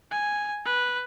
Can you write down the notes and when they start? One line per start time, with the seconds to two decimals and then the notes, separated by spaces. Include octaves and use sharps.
0.11 G#5
0.65 B4